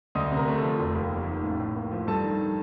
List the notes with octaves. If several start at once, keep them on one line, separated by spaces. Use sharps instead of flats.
D2 D#5 D#6
C3
A#4 A#5
A3
A4 A5
F3
F1
D#2
A#3
D#3
A1
A2
A#3
F3
G2 A4 A5
D#3